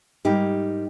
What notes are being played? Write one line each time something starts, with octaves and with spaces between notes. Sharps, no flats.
G#2 G3 A#3 D#4 G4